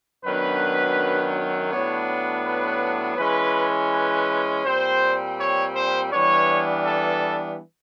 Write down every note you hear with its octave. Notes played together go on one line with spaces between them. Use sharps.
F#2 D#3 F#3 B3 D4 B4
A2 F#3 B3 D4 C#5
B4
E3 G#3 C#4 B4
B4
A#2 G3 C4 C5
C#5
C5
E3 G3 B3 D4 C#5
A4